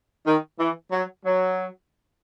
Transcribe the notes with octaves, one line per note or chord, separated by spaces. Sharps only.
D#3
E3
F#3
F#3